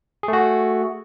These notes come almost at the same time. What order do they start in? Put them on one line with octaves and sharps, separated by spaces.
G#4 A3 F#4